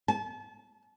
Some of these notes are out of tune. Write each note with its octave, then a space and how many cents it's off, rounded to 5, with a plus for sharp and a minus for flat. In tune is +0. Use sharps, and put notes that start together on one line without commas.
A5 -35